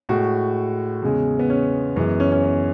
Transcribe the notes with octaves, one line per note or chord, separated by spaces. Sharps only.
A2 G#3 F#4
E2 C#3 G#3
B3
C#4
F#2 E3 G#3 B3
C#4
C#4
B3